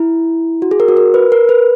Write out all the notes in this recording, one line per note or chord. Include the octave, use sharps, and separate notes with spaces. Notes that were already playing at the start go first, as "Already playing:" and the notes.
Already playing: E4
F#4
G#4
A#4
F#4
A#4
B4
A#4
B4